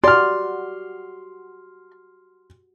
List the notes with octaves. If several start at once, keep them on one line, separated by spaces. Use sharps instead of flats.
F#4 G4 D5 C6 F6